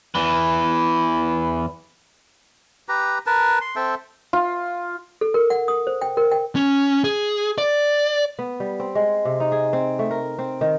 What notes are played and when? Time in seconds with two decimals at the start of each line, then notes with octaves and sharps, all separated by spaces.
0.15 E2 E3
2.89 G4 B4 A#5
3.26 A#4 B4 A5
3.61 C6
3.76 C4 A4 E5 G5
4.33 F4
5.21 A4
5.34 A#4
5.50 F#5
5.68 D#6
5.87 C5
6.02 G5
6.17 A#4
6.32 G5
6.56 C#4
7.04 G#4
7.58 D5
8.39 B3
8.60 G3
8.80 C4
8.95 G#3
9.25 C3
9.40 D#4
9.52 G#4
9.73 C4
9.99 A3
10.11 A#4
10.39 C4
10.61 D#3